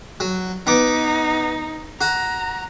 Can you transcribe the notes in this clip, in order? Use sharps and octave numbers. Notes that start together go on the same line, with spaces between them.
F#3
B3 D#4 D6
F#4 A#5